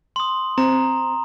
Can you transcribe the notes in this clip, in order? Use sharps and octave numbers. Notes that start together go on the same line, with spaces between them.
C6 D#6
C4 A#5